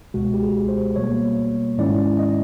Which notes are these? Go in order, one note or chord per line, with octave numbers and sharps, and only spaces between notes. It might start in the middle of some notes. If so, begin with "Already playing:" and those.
C#2 B2 G#3 F#4
G4
G#4
C5
B2 G3 A#3 C#5
G#2 D#3 G#3 C#4 E4 D5
D#5